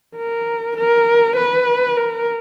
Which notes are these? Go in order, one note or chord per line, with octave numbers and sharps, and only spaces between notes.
A#4
A#4
B4
A#4